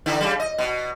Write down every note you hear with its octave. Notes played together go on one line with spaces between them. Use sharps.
D3 E3 E4
C#3 G3
D#5
B2